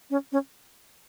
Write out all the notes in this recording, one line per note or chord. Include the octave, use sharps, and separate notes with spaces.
C#4
C#4